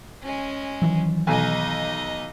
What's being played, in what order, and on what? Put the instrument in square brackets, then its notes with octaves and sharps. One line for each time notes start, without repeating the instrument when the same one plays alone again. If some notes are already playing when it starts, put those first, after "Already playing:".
[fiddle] G#3 C#4
[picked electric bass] D#3 E3 F#3
[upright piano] B1 G#5 [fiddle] D#4 D#5